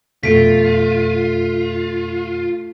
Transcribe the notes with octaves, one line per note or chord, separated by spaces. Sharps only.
F2 B2 A3 F4 B6 D7